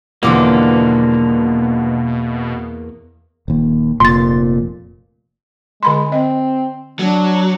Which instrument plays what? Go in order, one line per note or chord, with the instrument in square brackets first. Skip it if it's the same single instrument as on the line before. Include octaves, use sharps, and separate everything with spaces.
[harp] E2 D6 [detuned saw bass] B2 [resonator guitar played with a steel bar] D3 F3 G3 [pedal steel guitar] A#3
[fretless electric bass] D#1 D#2
[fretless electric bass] F1 A#2 [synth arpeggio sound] C6 A6
[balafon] D3 B5 C6 [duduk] G#3
[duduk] C4 [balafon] D#5
[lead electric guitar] F#3 [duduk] D4